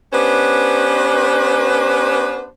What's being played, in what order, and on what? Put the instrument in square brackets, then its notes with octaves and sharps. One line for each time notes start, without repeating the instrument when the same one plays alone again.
[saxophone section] B3 C#4 D4 G4 B4 C5